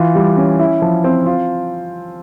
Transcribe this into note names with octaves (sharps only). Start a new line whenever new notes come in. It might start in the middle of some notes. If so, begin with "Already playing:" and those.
Already playing: E3 F4
G3
C#4
E4
F3
C4
F4